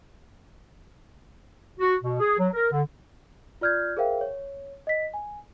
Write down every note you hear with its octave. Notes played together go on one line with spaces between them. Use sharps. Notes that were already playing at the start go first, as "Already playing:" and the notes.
F#4
B2
G#4
F#3
A#4
D3
F4 D5 F6 G6 G#6
G#4 A#4 C5 E5 F5 G5
C#5
D#5 B6
G#5